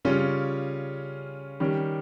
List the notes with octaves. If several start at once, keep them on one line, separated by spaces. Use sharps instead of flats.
C#3 G3 C#4 F4
D#3 G3 C#4 G4